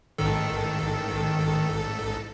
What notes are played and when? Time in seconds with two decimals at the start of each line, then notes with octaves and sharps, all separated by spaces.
0.18 A1 G#2 D#3 A4